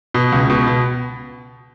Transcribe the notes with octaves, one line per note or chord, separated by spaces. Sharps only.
B2
C#2
B2
B2